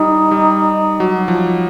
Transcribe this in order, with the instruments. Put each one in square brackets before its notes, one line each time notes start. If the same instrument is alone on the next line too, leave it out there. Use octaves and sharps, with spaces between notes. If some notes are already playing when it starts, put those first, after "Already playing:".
Already playing: [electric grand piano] G3 [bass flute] D#4
[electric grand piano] G3
F#3
F3